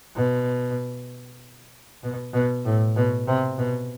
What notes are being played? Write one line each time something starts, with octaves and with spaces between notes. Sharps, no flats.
B2
B2
B2
A2
B2
C3
B2